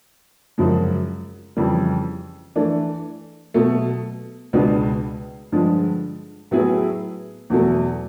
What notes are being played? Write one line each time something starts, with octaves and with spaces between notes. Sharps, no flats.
F#2 C#3 F3 G#3
F2 C#3 E3 G3
E3 A3 D4
B2 F#3 A3
C#2 B2 G#3 B3 D4
G2 D3 F3 G#3
A2 F#3 B3 E4 G#4
E2 B2 F#3 A3